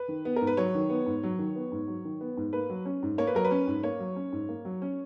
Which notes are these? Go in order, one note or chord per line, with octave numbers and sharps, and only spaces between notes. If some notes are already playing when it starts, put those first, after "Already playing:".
Already playing: B4
D#3
B3
G#2 A#4
B4
F#3 C#5
D#3
B3
G#2
F#3
D#3
B3
G#2
F#3
D#3
B3
G#2
A#3 B4
F#3
C#4
G#2
A#3 C#5
B4
F#3 A#4
B4
C#4
G#2
A#3 C#5
F#3
C#4
G#2
A#3
F#3
C#4